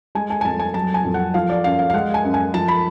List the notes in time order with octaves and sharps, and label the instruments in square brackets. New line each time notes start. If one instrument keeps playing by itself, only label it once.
[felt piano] G#3 G#5
G#5
G#5
F2 A5
G#5
F#3 A5
G#5
F2
F#5
F3 F5
D5
F#2 F5
F5
F5
G#3 F#5
G#5
F#2
G#5
F3 A5
B5